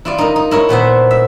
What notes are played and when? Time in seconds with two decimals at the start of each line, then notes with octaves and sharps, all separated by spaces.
0.05 E4 F4 D5
0.18 D#4 A#4
0.36 D#4
0.51 E4 A#4 C#5
0.69 A#2 B3 C5 E5
1.11 E5